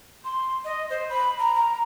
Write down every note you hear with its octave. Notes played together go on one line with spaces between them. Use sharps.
C6
D#5
C5
B5
A#5
A#5